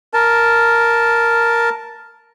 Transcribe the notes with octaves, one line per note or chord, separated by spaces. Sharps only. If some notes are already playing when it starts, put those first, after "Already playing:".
A#4 A5